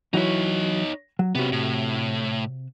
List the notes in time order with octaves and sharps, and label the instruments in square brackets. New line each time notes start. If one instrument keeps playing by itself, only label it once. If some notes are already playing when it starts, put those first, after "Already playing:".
[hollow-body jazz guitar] E3 F#3 E4 [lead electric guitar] D#4 C#5
[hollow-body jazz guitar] F#3
[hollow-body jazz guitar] C3 F#4 [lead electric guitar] B3 C#4
[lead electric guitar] A2